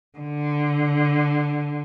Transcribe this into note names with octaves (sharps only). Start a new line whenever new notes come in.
D3